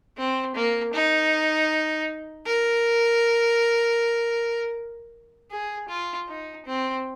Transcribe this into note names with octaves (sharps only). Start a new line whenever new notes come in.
C4
A#3
D#4
A#4
G#4
F4
D#4
C4